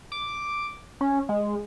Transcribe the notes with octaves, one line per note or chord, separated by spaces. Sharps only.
D6
C#4
G#3